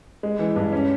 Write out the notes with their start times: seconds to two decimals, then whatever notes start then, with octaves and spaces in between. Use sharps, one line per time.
0.23 G#3
0.39 E3
0.56 G2
0.73 C#4